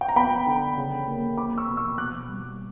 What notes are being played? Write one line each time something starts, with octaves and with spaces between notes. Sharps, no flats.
G5
A#5
B3 G5 B5
D3
C#3
A#3
A#3 B5 D6
C#6 E6
B2
C#6 E6
B2 D6 F#6
G3